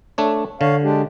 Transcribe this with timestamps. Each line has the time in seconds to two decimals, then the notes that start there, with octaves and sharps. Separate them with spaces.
0.18 A3 D4 C#5
0.61 D3 C#5 F5
0.84 G#3 D4 G4